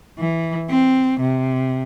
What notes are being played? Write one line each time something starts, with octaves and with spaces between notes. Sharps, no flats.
E3
C4
C3